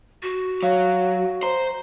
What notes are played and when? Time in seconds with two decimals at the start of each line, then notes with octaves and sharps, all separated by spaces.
0.23 F#4
0.63 F#3 C#5 F5
1.43 C5 A#5